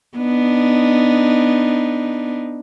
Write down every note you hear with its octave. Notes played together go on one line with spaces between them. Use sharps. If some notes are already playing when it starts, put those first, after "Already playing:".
B3 D4 D#4